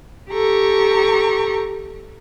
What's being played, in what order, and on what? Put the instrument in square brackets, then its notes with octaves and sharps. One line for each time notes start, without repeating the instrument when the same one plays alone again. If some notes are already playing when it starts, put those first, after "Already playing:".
[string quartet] G4 A4 A#5 C#6